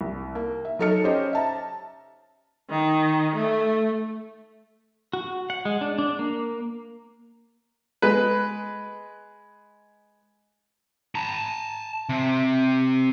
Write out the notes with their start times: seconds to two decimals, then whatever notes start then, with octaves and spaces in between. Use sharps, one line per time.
0.01 C2
0.35 A#3
0.65 E5
0.79 F#3 D#4 A4 D#5 F6 C#7
1.04 C#4 G4 C5 D#5
1.33 E5 A5 A#5
2.69 D#3
3.36 A3
5.13 F#4
5.50 F#5
5.65 G#3
5.81 D4
5.98 D4
6.19 A#3
8.02 G#3 B4
11.15 A5 A#5
12.09 C3